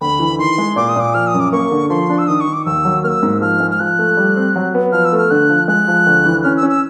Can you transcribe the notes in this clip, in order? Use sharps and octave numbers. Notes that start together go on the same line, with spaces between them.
D2 B5
E3
D#3 C6
G#3
A#2 D6
D#6
A#2 D6
F3 F6
D#6
F#2
D6
A#3 C#6
D3
F3 C6
D4
E6
D#3 D#6
C#6
D#3
D6
D#2 E6
F#3
A#3 E6 F6
G#2
F3 F6
G#3
F6
F3 F#6
A3
G3
C4
F#3
B3
F3 F6
E6
A3
F6
D3 F#6
F3
G#3 F#6
F3
D2
E3
C#4 F6
E6
C#4
E6